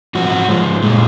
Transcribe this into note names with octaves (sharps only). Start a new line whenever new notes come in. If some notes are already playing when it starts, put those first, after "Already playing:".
G#2 F3 F#4
G#2 F3 G#3
A#2 G#3